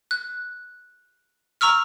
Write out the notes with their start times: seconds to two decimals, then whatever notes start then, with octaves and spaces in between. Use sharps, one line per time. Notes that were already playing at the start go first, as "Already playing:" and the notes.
0.11 F#6
1.61 A#5 C#6 E6 F6